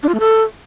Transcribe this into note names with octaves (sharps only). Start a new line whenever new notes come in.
D4
F4
A3
A4